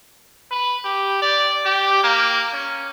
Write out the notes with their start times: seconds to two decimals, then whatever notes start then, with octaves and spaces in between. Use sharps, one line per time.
0.51 B4
0.84 G4
1.21 D5
1.65 G4
2.03 A#3
2.53 C#4